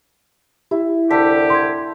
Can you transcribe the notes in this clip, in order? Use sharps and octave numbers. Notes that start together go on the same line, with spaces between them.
E4 G4
C2 D3 G4 A4 B6
C6 G#6